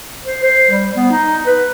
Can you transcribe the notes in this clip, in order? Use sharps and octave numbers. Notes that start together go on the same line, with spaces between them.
C5
C5
G3
B3
D#4
B4